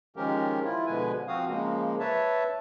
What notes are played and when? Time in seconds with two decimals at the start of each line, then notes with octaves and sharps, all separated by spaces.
0.16 D#3 F3 G#3 C#4 G4 A#4
0.64 E4 F4
0.86 B2 D3 F3 G#3 B4 G#5
1.28 F3 C4 F#4 F5 D#6
1.47 C#3 F3 G#3 A#3
2.00 B4 C#5 E5 A5